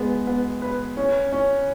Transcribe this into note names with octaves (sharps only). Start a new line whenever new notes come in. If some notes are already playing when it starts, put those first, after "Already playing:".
Already playing: G#3 B3
B3
B4
C#4
C#4